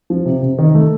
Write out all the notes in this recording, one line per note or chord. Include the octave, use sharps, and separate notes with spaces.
F3
C3
C3
D#3
A3